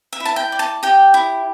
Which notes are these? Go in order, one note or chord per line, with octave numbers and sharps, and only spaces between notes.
E5
E4
A5
G5
D5
A5
G4 G5
E4